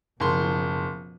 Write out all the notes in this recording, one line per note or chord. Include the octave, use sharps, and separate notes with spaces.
F#1 B2 F3 C6